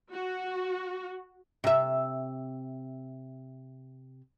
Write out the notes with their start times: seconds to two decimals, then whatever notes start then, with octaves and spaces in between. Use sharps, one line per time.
0.12 F#4
1.64 C3 E5